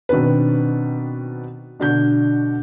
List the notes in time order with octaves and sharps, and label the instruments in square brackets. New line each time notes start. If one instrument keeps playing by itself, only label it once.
[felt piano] B2 D#3 C4 D4 B4
B2 D3 D4 F#4 G6